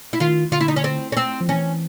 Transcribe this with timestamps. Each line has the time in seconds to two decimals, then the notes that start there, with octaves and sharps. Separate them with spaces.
0.13 E4
0.20 D#3 F4
0.52 D3 F4
0.61 E4
0.68 D#4
0.76 C#4
0.84 C4
1.12 C#4
1.17 C4
1.41 F3
1.48 E3 C#4